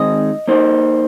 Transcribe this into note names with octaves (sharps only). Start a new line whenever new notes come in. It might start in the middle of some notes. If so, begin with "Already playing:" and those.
Already playing: D#3 G#3 C4 D#4 D#5
A#3 D#4 C5